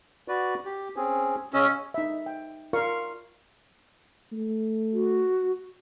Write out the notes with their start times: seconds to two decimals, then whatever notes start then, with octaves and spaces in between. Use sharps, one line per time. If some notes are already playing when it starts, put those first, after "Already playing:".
0.28 F#4 B4 D5
0.65 G4
0.96 C4 C#4 G#4
1.54 C#3 C#4 D#5 E6
1.94 D#4 E5
2.26 G5
2.73 F4 A#4 D5 F5 C#6
4.32 A3
4.93 F#4